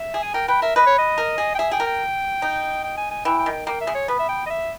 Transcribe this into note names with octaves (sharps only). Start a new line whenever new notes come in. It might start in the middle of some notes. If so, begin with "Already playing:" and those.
Already playing: E5
G#4
G#5
A#4 G5
B4 G5
A#4 E5
B4 D#5
C#5
D#5
A#4
G#4
G5
G#4 E5
G#4 G5
A#4
G5
D#4
G5
G#5
G#5
E3 G5
G5
D#3
G5
A#3 G5
E5
G#3
C#5
B3 B4
E5
G5
D#5
E5